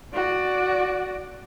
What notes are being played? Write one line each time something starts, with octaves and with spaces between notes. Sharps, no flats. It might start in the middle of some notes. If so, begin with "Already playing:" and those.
F#4 D5